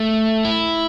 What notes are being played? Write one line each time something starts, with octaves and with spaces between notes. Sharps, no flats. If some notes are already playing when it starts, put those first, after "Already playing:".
Already playing: A3
E4